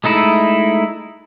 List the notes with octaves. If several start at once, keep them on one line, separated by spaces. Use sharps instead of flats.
G#3 A3 D#4 E4